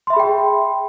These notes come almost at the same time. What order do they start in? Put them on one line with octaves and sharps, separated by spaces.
C6 E5 B5 G#4 G5